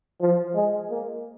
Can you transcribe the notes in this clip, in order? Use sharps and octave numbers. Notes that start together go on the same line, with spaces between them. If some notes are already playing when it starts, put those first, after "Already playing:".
F3
G#3
A#3